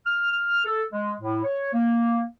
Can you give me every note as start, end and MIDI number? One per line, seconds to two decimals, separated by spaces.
0.06 0.64 89
0.65 0.83 69
0.93 1.13 56
1.21 1.42 45
1.44 1.70 73
1.74 2.23 58